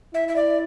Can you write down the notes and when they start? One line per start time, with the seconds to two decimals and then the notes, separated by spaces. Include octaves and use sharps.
0.14 E4 E5
0.28 E5
0.36 D5